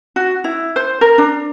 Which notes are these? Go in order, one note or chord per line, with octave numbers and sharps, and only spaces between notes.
F#4
E4
C5
A#4
D4